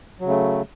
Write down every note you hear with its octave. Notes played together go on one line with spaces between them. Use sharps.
C#3 F#3 A3